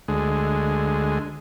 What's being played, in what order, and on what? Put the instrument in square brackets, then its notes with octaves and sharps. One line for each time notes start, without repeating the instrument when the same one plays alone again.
[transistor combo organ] D2 G#3